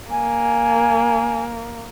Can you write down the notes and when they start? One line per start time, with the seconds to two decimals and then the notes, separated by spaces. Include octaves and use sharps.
0.11 A#3 G#5